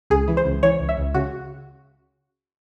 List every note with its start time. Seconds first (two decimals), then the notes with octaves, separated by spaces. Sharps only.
0.10 C#2 G#4
0.28 E3
0.37 C5
0.45 C#2
0.63 E3 C#5
0.80 C#2
0.89 E5
0.97 C#2
1.14 C#3 F#4